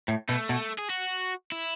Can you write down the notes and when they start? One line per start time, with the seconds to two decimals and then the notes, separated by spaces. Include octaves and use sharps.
0.08 A2
0.29 B2 A3
0.49 B2
0.79 G#4
0.90 F#4
1.52 E4